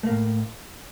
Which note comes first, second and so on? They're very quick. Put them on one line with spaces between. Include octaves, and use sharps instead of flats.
A3 A#3 A2